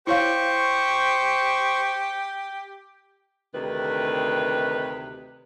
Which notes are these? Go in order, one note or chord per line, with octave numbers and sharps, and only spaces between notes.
E4 G4 C5 C#5 F5 C#6
D2 C3 D#3 B4